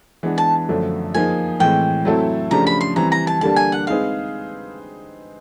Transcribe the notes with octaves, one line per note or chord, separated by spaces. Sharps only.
E3 G#3 B3 D4
A5
F#2 D3 F3 A3 D4
F3 A#3 D#4 G#4 G#5
A2 E3 G#3 C4 G5
F#3 A3 C4 E4 A4
C#3 F3 A3 D4 G4 A#5
B5
C6
E3 G3 C4 A#5
A#5
A5
D3 G3 A#3 D4 G4 A5
G#5
F#5
G#3 C4 D#4 G#4 B4 F5